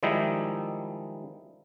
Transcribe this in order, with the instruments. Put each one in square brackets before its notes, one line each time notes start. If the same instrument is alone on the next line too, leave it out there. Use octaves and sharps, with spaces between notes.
[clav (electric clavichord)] D#3 F3 G3 G#3 D#4 E4